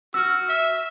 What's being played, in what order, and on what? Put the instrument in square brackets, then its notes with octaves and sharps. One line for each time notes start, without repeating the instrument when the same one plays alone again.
[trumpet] F#4 [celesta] E6 F6
[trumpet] E5